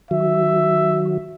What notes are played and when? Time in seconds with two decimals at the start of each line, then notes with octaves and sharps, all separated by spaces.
0.11 D#3 F#3 F#4 E5